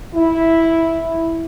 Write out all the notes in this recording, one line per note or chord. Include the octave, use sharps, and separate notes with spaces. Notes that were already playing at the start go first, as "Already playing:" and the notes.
E4